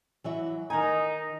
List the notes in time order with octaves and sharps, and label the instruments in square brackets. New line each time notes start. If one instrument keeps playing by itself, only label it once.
[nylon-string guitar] E3 F#3 E5
[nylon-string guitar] D#3 G#5 [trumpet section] D#4 D#5 A#5